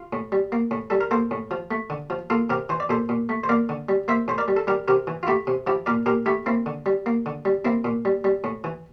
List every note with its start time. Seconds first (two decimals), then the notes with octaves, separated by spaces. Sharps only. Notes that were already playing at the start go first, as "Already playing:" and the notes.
Already playing: F4
0.13 A2
0.32 G3
0.52 A#3
0.71 A2
0.90 G3 A4
1.01 A#4
1.11 A#3 A4 C5
1.31 A2
1.51 F3
1.71 A3
1.90 D3
2.10 F3
2.30 A#3 F4 A4
2.50 C3 G4 A#4
2.69 E3 C5
2.80 D5
2.89 A#2 A4 C5
3.09 A#2
3.29 A3
3.44 C5
3.49 A#3 A#4 D5
3.69 D3
3.89 G3
4.08 A#3 C5 E5
4.28 A2 C5
4.38 A#4 D5
4.48 G3
4.56 A4
4.67 G3 G4 A#4
4.88 C3 G4 A#4
5.07 E3
5.23 F4
5.27 A3 E4 G4
5.47 C3
5.67 F3 E4 G4
5.86 A#2 A#4 D5
6.06 A#2 G4 A#4
6.26 A3 E4 G4
6.46 A#3 C4 E4
6.66 D3
6.86 G3
7.06 A#3
7.26 D3
7.45 G3
7.65 A#3 C4 E4
7.84 A#2
8.05 G3
8.24 G3
8.44 A2
8.64 E3